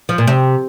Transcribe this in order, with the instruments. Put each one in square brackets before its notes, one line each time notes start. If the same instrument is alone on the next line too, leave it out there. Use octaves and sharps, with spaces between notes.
[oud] F3
A#2
C3